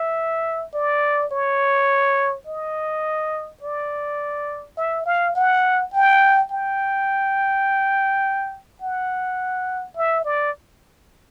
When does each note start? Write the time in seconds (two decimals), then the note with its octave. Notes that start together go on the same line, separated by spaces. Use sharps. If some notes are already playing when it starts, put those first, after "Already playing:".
Already playing: E5
0.74 D5
1.32 C#5
2.47 D#5
3.63 D5
4.78 E5
5.06 F5
5.35 F#5
5.93 G5
6.51 G5
8.82 F#5
9.97 E5
10.25 D5